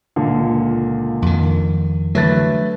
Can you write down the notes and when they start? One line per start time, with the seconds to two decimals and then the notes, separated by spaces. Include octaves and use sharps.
0.16 C#2 A#2 D3
1.22 F2 D#3
2.15 D3 E3 F#3 A3 B4 A6